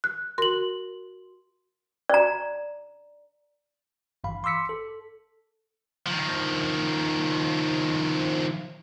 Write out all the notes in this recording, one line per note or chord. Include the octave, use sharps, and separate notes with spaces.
F#6
F#4 A#4 C6 F#7
D5 A#5
G#1 G2 E3 F5 B5
C6 D6 E6 B6 C#7
A4
D#3 F3